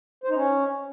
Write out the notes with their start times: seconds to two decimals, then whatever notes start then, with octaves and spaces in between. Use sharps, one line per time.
0.24 C5
0.30 D#4
0.35 C#4